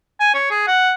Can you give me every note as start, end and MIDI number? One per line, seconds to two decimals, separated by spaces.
0.20 0.32 80
0.34 0.47 73
0.50 0.67 68
0.67 0.94 78